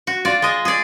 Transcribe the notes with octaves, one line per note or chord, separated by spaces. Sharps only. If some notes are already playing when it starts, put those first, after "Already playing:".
F#4
F4 D5
G#3 D#5
G#4 D5